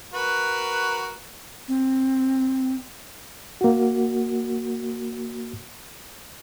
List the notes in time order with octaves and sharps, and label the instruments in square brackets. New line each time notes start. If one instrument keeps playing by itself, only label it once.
[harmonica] F#4 A#4 B4
[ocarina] C4
[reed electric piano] A#3 F#4